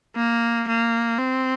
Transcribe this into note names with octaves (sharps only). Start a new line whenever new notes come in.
A#3
A#3
C4